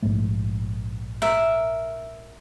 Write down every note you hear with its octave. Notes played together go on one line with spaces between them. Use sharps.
A#1 G#2 A3
A#4 E5